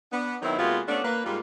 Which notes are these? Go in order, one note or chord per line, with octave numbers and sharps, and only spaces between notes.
B3 D4
D#3 F#3 B3 C4 D#4 E4
C3 G#3 A#3 B3 F4 F#4
A3 B3 C#4 D4
A#3 B4
G#2 G3 G#3 A#3 F4